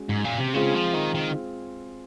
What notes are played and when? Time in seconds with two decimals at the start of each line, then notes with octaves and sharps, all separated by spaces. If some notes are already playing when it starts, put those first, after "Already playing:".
Already playing: G#3 C#4 F#4
0.09 G#2
0.24 A#2
0.39 C3
0.54 C#3 G#3 C4 F4 G#4
0.75 F3
0.94 D#3
1.15 D#3